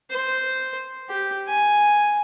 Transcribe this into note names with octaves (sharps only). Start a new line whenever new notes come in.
C5
G4
G#5